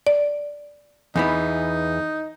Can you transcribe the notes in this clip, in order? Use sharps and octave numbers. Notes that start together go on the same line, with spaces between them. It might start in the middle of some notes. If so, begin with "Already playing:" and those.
D5
E2 E3 B3 D#4